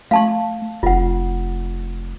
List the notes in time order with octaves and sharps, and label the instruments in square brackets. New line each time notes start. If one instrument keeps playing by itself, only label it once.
[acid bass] A3 [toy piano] F5 A5 C#6
[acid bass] F1 [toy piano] F4 F#5